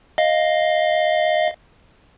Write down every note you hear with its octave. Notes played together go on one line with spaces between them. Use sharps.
D#5 F5